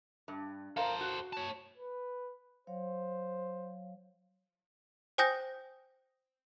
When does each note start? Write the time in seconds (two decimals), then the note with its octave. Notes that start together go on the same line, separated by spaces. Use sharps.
0.28 G2
0.77 A4 A#4 C5 F5
1.01 F#4
1.33 C#5 A5
1.77 B4
2.67 F#3 C5 C#5 F5
5.18 C5 G5 G#5 D#6 G6 A#6